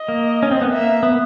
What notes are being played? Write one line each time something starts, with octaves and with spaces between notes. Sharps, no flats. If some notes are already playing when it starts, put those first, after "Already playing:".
Already playing: D#5
A#3
C#4
C4
B3
A#3 E5
B3